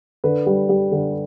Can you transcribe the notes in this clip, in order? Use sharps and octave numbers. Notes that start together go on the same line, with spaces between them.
D3 B4
G3
G3
D3